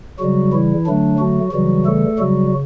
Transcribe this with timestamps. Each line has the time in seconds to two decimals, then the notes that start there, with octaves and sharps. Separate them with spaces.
0.19 C#3 F#3 G3 F#4
0.53 E3 E4
0.86 D3 F#3 A3 D4
1.19 F#3 F#4
1.52 C#3 E3 F#3 G3 F#4
1.86 A3 A4
2.19 C#3 F#3 G3 F#4